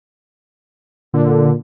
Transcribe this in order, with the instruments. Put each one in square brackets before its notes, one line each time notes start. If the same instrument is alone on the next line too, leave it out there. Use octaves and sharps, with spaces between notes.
[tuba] A#2 [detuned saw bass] D3